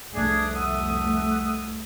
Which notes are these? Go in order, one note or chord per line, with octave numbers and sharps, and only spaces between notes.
F1 C2 A3 D4 G#4
E5 F#5 D#6